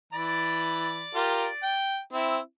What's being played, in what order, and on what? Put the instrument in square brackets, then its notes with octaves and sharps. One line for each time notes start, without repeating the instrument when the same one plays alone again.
[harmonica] E3 B5 [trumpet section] D5
[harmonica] F4 G4 A#4
G5
C4 E4